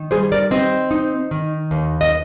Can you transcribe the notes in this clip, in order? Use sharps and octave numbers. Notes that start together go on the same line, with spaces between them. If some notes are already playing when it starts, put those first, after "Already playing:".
Already playing: D#3
G3 G#4 C5
A#4 D5
C4 C5 D#5
D#4
D#3
D#2
D#5